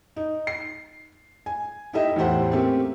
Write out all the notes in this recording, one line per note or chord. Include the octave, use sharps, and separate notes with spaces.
D#4
C7
G#5
D#4 E4 G4 A4 D#5 E5
E2 A2 G4 C5 F#5
A3 A#3 C4 C#4 G4